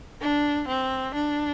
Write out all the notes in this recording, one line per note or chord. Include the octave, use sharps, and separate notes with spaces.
D4
C4
D4